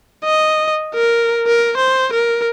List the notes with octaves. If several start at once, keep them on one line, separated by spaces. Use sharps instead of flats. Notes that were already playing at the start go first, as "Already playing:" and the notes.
D#5
A#4
A#4
C5
A#4